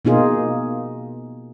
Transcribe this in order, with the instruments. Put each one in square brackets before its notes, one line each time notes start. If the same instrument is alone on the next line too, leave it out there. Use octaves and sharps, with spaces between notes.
[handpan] B2 A#3 D#4 F4 G#4